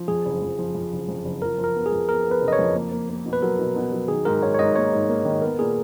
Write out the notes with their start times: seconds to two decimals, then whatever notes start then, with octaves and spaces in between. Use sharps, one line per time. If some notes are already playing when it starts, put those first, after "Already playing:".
Already playing: F3
0.08 F2 G#4
0.26 F#1
0.42 F2
0.59 F3
0.75 F2
0.93 F#1
1.08 F2
1.25 F#1
1.42 F3 A#4
1.58 F3
1.64 A#4
1.75 B3
1.86 G#4
1.92 F2
2.08 B3 A#4
2.26 B3
2.31 B4
2.42 F#1
2.48 D#5
2.53 C#5
2.59 F2
2.75 A#3
2.92 A#3
3.09 A#3
3.26 B2
3.33 B4
3.42 F#3 A#4
3.59 B2
3.76 B2
3.92 F#3
4.08 D#3 G#4
4.25 G#2 A#4
4.42 G#2 C#5
4.55 C#5
4.59 G#2 D#5
4.76 A#3 C#5
4.92 G#2
5.09 A#3
5.25 D#3
5.42 B3 A#4
5.59 A#2 G#4